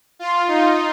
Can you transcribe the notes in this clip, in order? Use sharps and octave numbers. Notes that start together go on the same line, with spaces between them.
F4
D#4